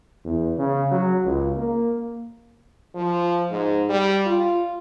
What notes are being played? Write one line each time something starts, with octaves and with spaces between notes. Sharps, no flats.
E2
C#3
F#3
C#2
A#3
F3
G#2
G3
F4